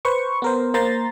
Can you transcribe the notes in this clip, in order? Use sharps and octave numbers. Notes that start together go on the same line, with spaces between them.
B4 C5 C#6
B3 A#4 C5
A#3 C5 A#5 C6 A6